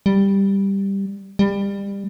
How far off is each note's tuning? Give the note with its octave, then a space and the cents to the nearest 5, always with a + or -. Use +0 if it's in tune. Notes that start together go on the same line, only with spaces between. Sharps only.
G3 +5
G3 +25